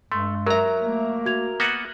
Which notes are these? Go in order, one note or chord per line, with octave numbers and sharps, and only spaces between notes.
G2 G#3 A3 C6
F#3 A#4 E5 A#5
A3 A#3
F#4 G#6 F7
A#3 B3 F#4 C#7 D#7 F#7